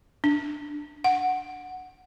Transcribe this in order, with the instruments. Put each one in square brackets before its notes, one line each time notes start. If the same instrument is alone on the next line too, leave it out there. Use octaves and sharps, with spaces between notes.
[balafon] D4
F#5